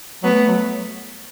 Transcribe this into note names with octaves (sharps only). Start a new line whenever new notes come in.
F#3 A3 B3
F#3